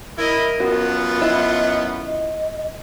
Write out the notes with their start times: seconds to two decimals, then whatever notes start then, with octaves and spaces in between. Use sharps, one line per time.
0.18 E4 A#4 D#5
0.60 F#2 B3 F4 F#4 A#4
1.22 E4 D#5
2.07 D#5